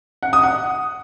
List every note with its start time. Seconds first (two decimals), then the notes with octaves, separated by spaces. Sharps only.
0.23 F#5
0.33 D#6
0.43 F#5